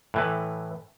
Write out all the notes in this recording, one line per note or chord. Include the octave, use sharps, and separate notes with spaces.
A2 E3 B4